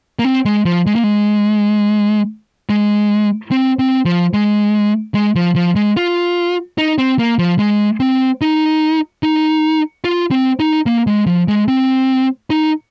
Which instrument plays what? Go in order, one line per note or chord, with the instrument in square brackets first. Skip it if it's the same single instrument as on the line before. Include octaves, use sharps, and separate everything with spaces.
[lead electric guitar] A#3
C4
G#3
F3
G#3
A#3
G#3
G#3
C4
C4
F3
G#3
G#3
F3
F3
G#3
F4
D#4
C4
A#3
F3
G#3
C4
D#4
D#4
F4
C4
D#4
A#3
G#3
F3
G#3
C4
D#4